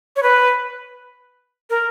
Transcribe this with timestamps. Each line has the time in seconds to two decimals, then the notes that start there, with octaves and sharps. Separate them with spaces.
0.16 C#5
0.23 B4
1.70 A#4